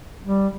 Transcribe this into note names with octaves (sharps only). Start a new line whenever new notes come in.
G3